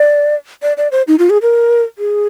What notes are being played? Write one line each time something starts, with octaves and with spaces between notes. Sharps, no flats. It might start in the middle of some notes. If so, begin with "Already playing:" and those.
Already playing: D5
D5
D5
C5
D#4
F4
G#4
A#4
G#4